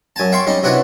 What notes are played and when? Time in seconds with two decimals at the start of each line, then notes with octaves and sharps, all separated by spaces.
0.16 F#2 G#5 A5
0.32 E5 F5 G5 C6 C#6
0.47 G3 C#4 D#4
0.63 C3 C#4 D4 E4 F#4 B4